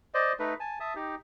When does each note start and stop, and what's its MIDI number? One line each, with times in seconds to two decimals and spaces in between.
0.14 0.33 72
0.14 0.33 74
0.14 0.33 75
0.39 0.54 57
0.39 0.54 63
0.39 0.54 71
0.60 0.79 80
0.60 0.79 81
0.80 0.94 76
0.80 0.94 81
0.80 0.94 87
0.95 1.15 63
0.95 1.15 67